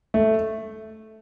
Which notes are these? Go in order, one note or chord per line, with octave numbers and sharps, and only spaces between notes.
A3